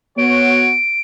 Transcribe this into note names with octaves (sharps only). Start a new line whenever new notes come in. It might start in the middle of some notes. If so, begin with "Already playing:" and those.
B3 F#4 C#5 D7